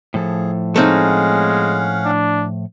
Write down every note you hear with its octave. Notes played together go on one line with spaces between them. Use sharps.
A2 F3 G#4 A4
G#3 A3 C4 C#4 D#4 F5 F#5
D4